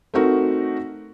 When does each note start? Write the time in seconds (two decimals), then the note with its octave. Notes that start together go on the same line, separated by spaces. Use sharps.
0.14 A3 C4 D#4 F#4 A#4